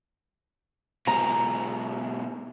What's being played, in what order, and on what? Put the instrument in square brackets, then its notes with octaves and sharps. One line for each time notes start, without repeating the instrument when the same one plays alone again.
[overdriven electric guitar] G#2 B2 [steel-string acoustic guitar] A#5